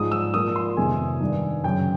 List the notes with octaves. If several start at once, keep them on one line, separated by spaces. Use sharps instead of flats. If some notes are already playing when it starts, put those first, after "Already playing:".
Already playing: G#2 F3 G#3 D#6
E6
A#2 F3 A#3 D#6
C6
F2 C3 D#3 G#3 B3 G#5
G2 D#3 G3
F#2 C#3 F#3 G5